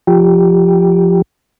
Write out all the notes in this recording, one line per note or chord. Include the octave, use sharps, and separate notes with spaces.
F3 G4